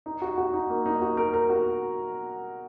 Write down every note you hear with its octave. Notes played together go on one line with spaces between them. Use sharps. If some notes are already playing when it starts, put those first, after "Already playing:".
D#4
F#4
F#4
D#4
A#3
D#4
F#4
A#4
A#4
F#4